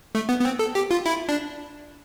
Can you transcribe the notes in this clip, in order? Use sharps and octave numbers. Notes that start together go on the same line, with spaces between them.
A3
B3
B3
C4
A4
G4
F4
E4
D4